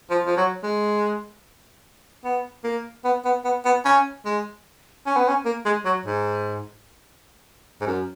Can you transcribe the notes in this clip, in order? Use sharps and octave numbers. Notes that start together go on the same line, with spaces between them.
F3
F3
F#3
G#3
B3
A#3
B3
B3
B3
B3
C#4
G#3
C#4
B3
C#4
A#3
G#3
F#3
G#2
G#2
F#2